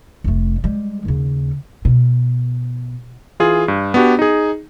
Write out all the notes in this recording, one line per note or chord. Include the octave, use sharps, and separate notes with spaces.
F1 A3
G3 G#3
D#2 C#3
B2
E3 F4 G#4
G2
B3 D4 F#4 G4
D#4 G#4